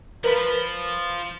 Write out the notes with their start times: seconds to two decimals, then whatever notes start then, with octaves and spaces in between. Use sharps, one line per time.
0.24 F3 A#4 B4 B5